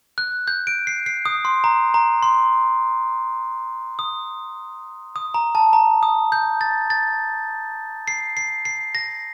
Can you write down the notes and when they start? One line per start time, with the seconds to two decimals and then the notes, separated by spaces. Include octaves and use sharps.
0.18 F#6
0.48 G6
0.67 D7
0.87 C7
1.06 C7
1.26 D#6
1.45 C6
1.64 A#5
1.94 A#5
2.23 C6
3.99 D#6
5.16 D#6
5.34 A#5
5.55 A5
5.73 A#5
6.03 D#6
6.32 G6
6.61 A6
6.90 A6
8.08 C7
8.37 C7
8.65 C7
8.95 A#6